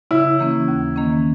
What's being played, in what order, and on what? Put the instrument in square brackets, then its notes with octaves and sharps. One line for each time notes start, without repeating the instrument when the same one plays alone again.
[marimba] C#3 [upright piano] E4
[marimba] E3 A#3 C#4
D#2
D#3 A#3 C#4